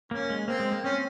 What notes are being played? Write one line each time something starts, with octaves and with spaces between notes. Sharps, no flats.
A#3 C#4
G#3
A#3 C4
G#3
A#3
C4 C#4